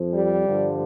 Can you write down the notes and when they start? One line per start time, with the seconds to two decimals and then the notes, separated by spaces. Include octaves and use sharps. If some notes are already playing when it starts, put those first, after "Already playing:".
Already playing: F2 F3
0.12 G3
0.45 G2 D3 F3